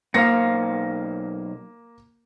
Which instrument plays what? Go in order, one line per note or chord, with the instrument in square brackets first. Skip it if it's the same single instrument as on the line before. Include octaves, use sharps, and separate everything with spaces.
[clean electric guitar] B1 C5 F5 [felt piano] A#3 A#6 C#7